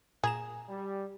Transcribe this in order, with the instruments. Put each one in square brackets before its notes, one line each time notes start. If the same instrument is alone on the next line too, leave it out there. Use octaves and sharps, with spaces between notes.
[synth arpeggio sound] A#2 A#5 E7 [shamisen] G#4
[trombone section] G3